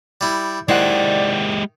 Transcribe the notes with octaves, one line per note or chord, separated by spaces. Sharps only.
G3 E4
D#3 G#3 E4 G4 C5 D5 F#5